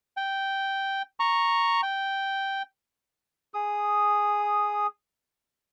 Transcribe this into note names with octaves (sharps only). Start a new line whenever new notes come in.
G5
A#5 C#6
G5
G#4 D#6